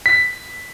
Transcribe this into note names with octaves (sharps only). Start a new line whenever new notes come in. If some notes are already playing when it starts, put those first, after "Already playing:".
B6